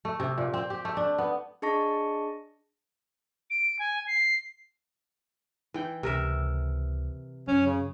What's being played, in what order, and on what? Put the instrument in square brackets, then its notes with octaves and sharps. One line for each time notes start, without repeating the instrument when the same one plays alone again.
[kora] A3
C3
A#2
C4
G4
A3
D4
B3
[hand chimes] D4 G#4 D#5 A5 C#6 A#6
[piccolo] D7
G#5
C7
[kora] E3 G5
[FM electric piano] C#2 [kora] C3 A#4 E5
[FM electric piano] F#2 [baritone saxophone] C#4
[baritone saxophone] C#3